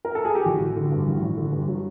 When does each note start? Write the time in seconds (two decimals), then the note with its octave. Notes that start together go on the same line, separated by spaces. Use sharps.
0.05 A#4
0.15 A4
0.25 G#4
0.35 G4
0.45 A1 F#4
0.60 A1
0.76 D3
0.92 G2
1.07 A1
1.22 A1
1.37 D3
1.52 G2
1.68 F#3